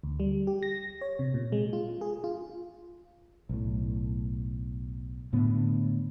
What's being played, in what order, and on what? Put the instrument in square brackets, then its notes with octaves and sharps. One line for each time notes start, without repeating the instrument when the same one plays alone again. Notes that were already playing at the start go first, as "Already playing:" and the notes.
[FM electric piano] D2
G3
G4
A#6
C#5
C3
A#2
G#3
F4
G#4
F4
[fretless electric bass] B1 A2
A2 D3 B3